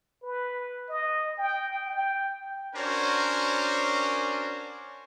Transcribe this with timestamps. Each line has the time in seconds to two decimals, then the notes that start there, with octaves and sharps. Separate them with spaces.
0.23 B4
0.89 D#5
1.38 G5
1.87 G5
2.76 C#4 D4 F#4 A#4 C5 C#5